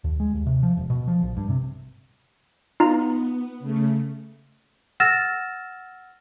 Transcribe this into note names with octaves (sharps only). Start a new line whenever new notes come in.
D#2
G#3
D#2
C3
F3
E1
B2
F3
A#1
G2
C3
B3 D#4 F4 A#5
C#3 A3
F#5 E6 F6 A6 A#6 E7